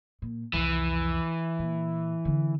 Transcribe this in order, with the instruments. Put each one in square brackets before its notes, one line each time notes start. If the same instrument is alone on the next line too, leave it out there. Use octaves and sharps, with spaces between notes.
[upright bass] A#2
[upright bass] C2 F2 [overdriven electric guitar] E3
[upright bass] A#2
D3 C4